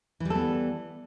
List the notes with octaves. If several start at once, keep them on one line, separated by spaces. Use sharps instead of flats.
E3 G3 B3 A4